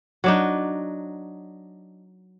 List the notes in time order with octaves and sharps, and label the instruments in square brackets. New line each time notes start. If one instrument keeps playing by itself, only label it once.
[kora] F#3 D4 D#4